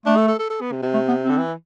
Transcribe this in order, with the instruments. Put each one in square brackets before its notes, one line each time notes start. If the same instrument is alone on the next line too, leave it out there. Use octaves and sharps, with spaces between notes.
[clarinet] A3 [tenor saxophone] D4
[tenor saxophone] A4
A4
A4
A4
B3
C3
C3
[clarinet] A3
B3
C4
[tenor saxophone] D3
E3